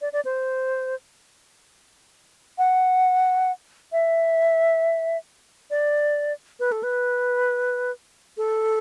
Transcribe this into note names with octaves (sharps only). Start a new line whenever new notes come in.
D5
D5
C5
F#5
E5
D5
B4
A4
B4
A4